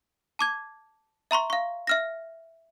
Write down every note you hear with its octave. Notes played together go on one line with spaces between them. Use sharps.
A5 D6 G#6
E5 A#5 C6 C#6
F5 C#6
E5 F6 A#6